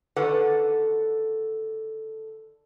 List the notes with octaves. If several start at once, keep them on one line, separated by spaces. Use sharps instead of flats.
D3 D#3 A4 B4 D5 F#5